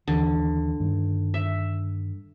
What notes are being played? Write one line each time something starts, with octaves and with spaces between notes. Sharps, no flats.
D#2 D3 E3
G2 D#3
E5